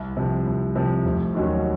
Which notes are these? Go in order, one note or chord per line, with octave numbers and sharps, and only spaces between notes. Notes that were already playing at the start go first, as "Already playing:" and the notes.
Already playing: C2
C3 F3
C2
C3 F3
F1
D#2 D#3 F#3 C#4